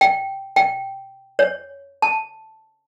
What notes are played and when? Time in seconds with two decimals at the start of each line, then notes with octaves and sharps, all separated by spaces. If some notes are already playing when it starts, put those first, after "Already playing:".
0.01 G5
0.56 G5
1.39 C#5
2.02 A5